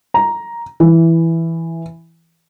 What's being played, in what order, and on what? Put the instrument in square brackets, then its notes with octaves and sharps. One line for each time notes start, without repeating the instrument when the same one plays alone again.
[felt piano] A#5
E3